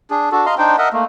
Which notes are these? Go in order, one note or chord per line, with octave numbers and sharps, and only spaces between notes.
D4 G#4
D4 F#4 A4
D#5 F5 A#5 C6
D4 D#4 C5 G5
A#4 D#5 E5 F#5
A3 A#3